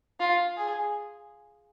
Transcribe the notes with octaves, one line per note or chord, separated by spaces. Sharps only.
F4
G#4